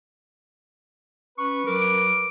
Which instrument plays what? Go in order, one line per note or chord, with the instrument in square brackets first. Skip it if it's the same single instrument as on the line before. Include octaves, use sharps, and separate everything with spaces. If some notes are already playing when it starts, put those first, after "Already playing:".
[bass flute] C#4 [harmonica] B4 [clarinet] C#6
[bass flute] F#3 [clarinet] A#4 [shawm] D6